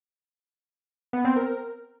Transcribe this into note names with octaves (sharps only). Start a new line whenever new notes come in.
B3
C4
A#4